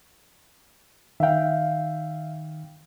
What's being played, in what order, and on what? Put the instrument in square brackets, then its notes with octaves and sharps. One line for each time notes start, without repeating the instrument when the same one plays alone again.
[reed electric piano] D#3 G5 [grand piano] E5 F5